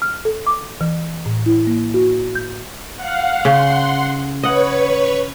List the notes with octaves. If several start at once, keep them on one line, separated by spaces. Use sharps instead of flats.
F6
A4
D6
E3
A2
E4
A#3
F#4
G6
F5 F#5
C#3 F#5 C6
B4 C#5 D#5 F#5 C#6